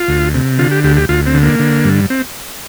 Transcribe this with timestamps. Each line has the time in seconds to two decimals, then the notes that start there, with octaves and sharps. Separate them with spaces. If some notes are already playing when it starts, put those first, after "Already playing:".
Already playing: F4
0.08 D2
0.34 C3
0.59 D3 F4
0.71 G4
0.84 D2 G4
0.96 G4
1.09 D2 F4
1.26 C4
1.34 D3
1.43 A#3
1.60 D3
1.85 G2
2.10 C4